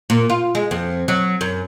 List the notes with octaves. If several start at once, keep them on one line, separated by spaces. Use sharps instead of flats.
A#2
F4
G#3
F2
F#3
F#2